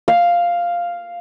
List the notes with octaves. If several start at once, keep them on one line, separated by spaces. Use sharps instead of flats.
F5